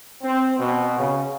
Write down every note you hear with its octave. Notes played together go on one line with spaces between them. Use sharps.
C4
B2
C#3